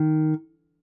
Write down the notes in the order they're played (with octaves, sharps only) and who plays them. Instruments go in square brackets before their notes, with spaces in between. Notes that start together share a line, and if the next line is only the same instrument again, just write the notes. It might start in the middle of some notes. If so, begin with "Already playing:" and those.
Already playing: [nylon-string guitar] D#3